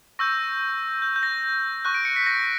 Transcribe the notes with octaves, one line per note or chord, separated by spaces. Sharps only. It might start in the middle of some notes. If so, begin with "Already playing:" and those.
C#6 E6 G6 A#6
G6
G6
A#6
C#6 F#6
D7
C#7
B6
A#6